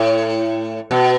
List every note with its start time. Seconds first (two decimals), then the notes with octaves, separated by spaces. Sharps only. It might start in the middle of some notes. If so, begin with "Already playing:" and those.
Already playing: A2
0.91 B2